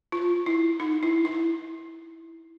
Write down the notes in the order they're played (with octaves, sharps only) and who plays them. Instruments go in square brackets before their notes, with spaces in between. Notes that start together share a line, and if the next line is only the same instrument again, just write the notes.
[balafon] F4
E4
D#4
E4
E4